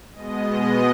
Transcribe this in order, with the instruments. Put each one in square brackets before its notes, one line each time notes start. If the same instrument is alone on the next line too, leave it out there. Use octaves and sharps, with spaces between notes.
[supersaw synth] B2 G#3 B3 D#5